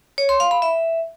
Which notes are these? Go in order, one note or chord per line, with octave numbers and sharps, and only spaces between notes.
C#5
C6
F5
B5
E5